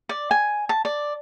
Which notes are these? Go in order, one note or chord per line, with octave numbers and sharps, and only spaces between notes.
D5
G#5
A5
D5